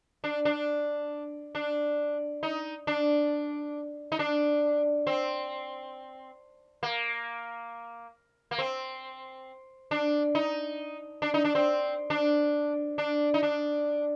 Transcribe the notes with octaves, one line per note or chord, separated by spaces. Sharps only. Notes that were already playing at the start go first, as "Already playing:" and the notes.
D4
D4
D4
D#4
D4
D#4
D4
C4
A#3
A#3
C4
D4
D#4
D4
D#4
D4
C4
D4
D4
D#4
D4